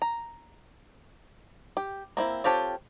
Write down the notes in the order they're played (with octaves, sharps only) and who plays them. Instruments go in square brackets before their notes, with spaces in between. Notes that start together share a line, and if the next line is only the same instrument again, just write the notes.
[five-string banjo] A#5
G4
A#3 C4 E4
C4 F4 G4 A4 C#5